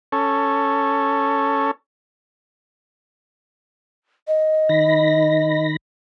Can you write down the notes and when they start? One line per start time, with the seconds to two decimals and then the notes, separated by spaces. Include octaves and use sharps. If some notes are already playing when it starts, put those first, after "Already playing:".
0.12 C#4 A4
4.28 D#5
4.69 D#3 B5 A#6